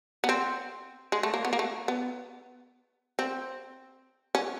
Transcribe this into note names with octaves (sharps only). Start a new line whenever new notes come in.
B3
C4
G#3
A3
A#3
B3
A#3
A3
B3
C4
C#4